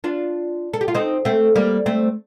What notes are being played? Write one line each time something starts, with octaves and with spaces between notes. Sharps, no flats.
D4 F4
A4
G4
F4
C4 D#4
A3 C4
G3 A#3
A3 C4